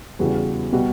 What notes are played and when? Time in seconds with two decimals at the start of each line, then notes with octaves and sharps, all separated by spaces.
0.19 E2 C#3 G3 B3 F#4
0.72 B2 G3 B3 F#4